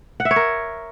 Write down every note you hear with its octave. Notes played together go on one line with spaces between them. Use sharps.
F#5
E5
C#5
A#4